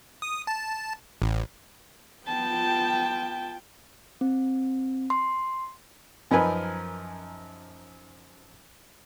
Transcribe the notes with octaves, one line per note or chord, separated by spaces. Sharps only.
D#6
A5
A1
B3 F4 G5 A5
C4
C6
F#2 F3 D#4 A#4 B4 G#5